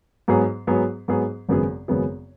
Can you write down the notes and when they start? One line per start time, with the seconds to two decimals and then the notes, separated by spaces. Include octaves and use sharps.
0.28 G#2 F#3 B3 G#4
0.67 G#2 F#3 B3 G#4
1.08 G#2 F#3 B3 G#4
1.48 G#1 F#2 C#3 B3 G#4
1.88 G#1 F#2 C#3 B3 G#4